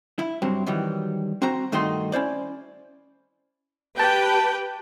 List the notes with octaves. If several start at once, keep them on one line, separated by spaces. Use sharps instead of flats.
E4
G2 C3 F#3 C4
D#3 E3 F#3 G3
C4 F#4 C5 A#5
G2 D#3 A3 D#4 F#4 C6
C#4 E4 C5 D5
G4 B4 G5 A5